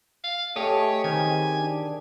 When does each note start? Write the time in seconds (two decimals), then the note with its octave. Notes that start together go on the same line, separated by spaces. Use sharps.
0.24 F5
0.56 A3 G4 G#4 C#5 D#5
1.04 D#3 C4 G#5
1.58 D4